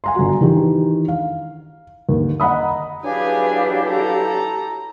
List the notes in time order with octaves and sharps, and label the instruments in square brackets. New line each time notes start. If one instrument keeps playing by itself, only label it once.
[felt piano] G#5 A#5 C6
G1 F#4
D#3 E3 D4 G4
F5
D#2 D3
D#5 F#5 A#5 B5 D#6
[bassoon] F#3 [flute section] D4 B4 F5 [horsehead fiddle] E4 G4 [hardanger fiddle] G#4 G#5
[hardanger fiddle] A4 A#5